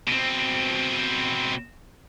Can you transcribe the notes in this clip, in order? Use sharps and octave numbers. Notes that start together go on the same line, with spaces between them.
B2 C4